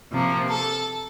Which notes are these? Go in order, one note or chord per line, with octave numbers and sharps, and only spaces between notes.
C3 F3 A#3
A4